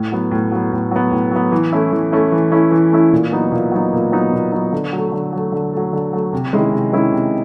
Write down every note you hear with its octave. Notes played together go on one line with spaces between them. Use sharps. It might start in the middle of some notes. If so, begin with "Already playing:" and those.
Already playing: A2
F#3 B3
A2
F#3 B3
A2
F#3 B3
A2
F#3 B3
E3
A3 C#4 E4
E3
A3 C#4 E4
E3
A3 C#4 E4
E3
A3 C#4 E4
A#2
F#3 B3 D#4
A#2
F#3 B3 D#4
A#2
F#3 B3 D#4
A#2
F#3 B3 D#4
D3
F#3 A3
D3
F#3 A3
D3
F#3 A3
D3
F#3 A3
C3
D#3 G#3 C#4 E4
C3
D#3 G#3 C#4 E4
C3